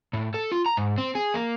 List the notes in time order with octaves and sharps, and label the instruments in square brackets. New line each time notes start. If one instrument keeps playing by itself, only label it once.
[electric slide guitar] A2
A4
F4
A#5
G#2
C4
G#4
A#3